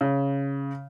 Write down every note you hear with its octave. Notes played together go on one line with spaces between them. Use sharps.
C#3